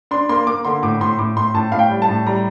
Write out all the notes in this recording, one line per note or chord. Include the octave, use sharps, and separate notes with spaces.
D4 C6
A#3 C6
A#3 D6
D3 C6
A2 D6
A2 C6
A2 D6
A2 C6
A2 A5
A2 F5
G5
G3
A5
A2
G3 A#5